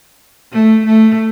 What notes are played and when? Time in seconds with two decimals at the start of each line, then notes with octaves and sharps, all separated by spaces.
0.52 A3
0.86 A3